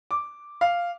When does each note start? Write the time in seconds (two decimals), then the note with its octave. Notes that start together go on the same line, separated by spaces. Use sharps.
0.11 D6
0.61 F5